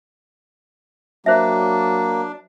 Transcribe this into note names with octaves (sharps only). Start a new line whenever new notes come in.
F#3 A#3 D4 C5 E5